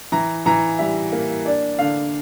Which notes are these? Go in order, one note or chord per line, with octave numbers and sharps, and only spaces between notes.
E3 A#5
E3 A#5
G3 E5
A#3
D4 D5
D3 F5